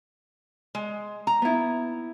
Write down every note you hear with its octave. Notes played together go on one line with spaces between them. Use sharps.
G#3
A#5
B3 E4